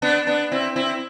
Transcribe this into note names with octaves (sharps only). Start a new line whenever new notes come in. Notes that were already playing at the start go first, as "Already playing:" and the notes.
B3 D4
B3 D4
C4 E4
C4 E4